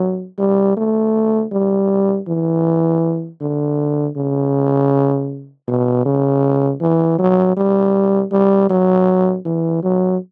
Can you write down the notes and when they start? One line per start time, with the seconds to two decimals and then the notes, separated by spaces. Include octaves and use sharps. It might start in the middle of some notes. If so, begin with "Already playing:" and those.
Already playing: F#3
0.39 G3
0.77 A3
1.52 G3
2.28 E3
3.41 D3
4.17 C#3
5.68 B2
6.05 C#3
6.81 E3
7.19 F#3
7.57 G3
8.32 G3
8.70 F#3
9.45 E3
9.83 F#3